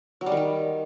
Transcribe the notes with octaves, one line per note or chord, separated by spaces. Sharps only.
F#3
G3
D#3
G3